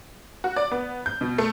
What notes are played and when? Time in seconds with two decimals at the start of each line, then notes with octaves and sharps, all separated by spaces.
0.44 F#4
0.56 D5
0.71 B3
1.06 G6
1.21 B2
1.38 A3